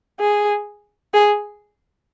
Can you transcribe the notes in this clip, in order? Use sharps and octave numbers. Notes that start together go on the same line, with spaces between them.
G#4
G#4